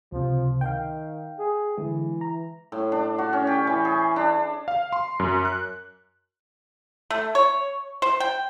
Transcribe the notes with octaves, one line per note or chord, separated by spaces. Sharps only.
C#2 C3 F3
D#3 F5 G5
G#4
D3 E3 G#3
A#5
A2
D4
F#4
C#4
G4
E3
G#4
D4
F5
C6
F#2
F#6
A3
C#5
C5
G5